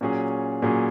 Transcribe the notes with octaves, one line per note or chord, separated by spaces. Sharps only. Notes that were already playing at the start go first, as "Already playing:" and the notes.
A#2 F#3 C#4 G#4
A#2 F#3 C#4 G#4